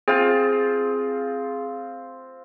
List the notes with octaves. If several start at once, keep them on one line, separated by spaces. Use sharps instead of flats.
C4 F4 G#4